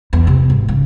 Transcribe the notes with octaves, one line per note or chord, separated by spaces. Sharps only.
E2
C3
G#1
C#3